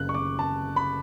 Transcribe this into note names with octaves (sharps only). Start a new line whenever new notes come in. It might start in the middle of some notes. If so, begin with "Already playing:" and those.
Already playing: F#1 F#2 C#3 F#6
C#6
D6
A5
B5